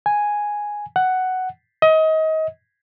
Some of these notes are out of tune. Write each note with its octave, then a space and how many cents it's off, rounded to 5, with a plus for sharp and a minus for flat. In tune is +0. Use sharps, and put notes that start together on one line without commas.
G#5 +0
F#5 +5
D#5 +30